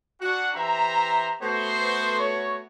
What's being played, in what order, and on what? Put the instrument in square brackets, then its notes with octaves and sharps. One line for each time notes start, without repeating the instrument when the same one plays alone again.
[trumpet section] D4 F#5 [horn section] F#4
[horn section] E3 G4 E5 [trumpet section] C5 A#5
[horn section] A3 B3 F#4 [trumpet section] C5
[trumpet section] C#5